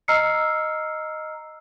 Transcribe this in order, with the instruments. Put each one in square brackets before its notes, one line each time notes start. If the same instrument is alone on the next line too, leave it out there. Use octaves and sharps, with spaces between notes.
[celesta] D#5 A#5 E6 F6 C7 C#7